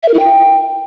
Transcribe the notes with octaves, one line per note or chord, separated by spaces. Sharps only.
E5
A#4
E4
G5